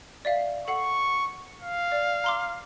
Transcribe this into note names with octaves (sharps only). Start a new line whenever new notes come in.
D5 E5 F5
A4 F#5 C#6 C7
F5
D5
A#5 C6 D6